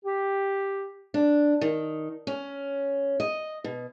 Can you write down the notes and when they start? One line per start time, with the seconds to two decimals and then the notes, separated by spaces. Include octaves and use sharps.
0.05 G4
1.14 D4
1.61 D#3
2.27 C#4
3.20 D#5
3.64 B2